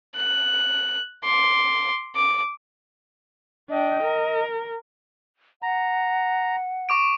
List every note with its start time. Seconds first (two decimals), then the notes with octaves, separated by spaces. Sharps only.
0.16 F#6
1.24 C6 D6
2.16 D6
3.70 D4 D#5 G5
4.03 A#4
5.62 F#5 A#5
6.89 C#6 D6 D7